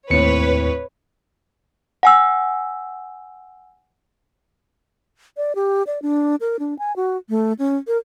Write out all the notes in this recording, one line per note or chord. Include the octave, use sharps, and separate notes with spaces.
D#2 A2 C4 B4 C#5 C#7
F#5 G#5 E6
D5
G4
D5
D4
A#4
D4
G#5
F#4
A3
C#4
A#4